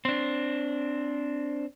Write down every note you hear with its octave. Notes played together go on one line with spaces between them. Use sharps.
C4 D4